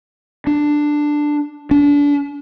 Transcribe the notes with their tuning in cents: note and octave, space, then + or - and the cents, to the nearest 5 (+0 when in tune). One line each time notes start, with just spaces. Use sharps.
D4 +10
D4 -30